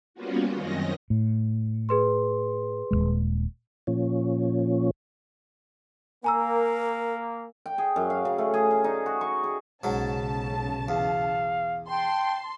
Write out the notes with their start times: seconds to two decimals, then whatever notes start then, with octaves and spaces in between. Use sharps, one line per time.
0.14 G3 A#3 B3 C#4 F4 F#4
0.54 F#2 D#3 C4 C#4 D#5 A#6
1.10 A2
1.89 G#4 B4 C6
2.91 D#1 B1 G#3
3.87 A#2 F3 C#4
6.24 A#3 A#4 G#5 A#5 E6
7.66 G5
7.78 G#4
7.96 F#2
8.10 F5
8.25 C#3
8.38 A3
8.54 G#4
8.71 G#4
8.84 D#4
9.06 F#4
9.21 C#6
9.44 G#4
9.84 B1 G#2 C#3 F#3 A5
10.88 E2 F5
11.87 G5 A5 C6